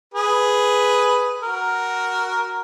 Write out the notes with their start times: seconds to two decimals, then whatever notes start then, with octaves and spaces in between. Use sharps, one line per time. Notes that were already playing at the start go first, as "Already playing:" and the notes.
0.14 G#4 B4
1.43 F#4 A#4